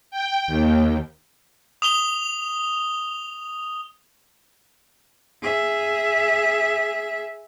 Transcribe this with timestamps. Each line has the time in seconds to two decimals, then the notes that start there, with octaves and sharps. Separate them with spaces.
0.11 G5
0.47 D#2
1.82 D#6 F7 G7
5.42 G#4 E5